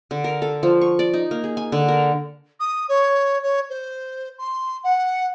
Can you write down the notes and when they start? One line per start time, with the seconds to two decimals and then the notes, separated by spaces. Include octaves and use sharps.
0.11 D3
0.24 A#4
0.42 A4
0.63 F3
0.81 C#6
0.99 D5
1.14 D#4
1.31 A#3
1.44 G#4
1.57 G#5
1.72 D3
1.88 A#4
2.60 D#6
2.89 C#5
3.43 C#5
3.70 C5
4.38 C6
4.84 F#5